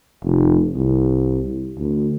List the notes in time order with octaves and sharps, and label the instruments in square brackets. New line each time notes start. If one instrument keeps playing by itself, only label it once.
[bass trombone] F1
C2
D2